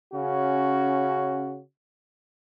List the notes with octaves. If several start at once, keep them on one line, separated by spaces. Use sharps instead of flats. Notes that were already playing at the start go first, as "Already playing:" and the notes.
C#3 C#4 F#4